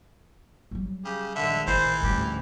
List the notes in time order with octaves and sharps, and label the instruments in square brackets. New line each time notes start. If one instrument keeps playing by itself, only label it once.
[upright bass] F#3 G3
[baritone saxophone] C#3 [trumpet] G4
[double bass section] A#1 D#3 G#3 [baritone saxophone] D3 [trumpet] E5
[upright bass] A1 [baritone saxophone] E3 [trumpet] C5
[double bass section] A1 D2 G#2 [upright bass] F3 G3 [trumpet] G4